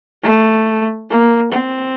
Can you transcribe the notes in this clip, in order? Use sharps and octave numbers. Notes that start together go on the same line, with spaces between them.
A3
A#3
C4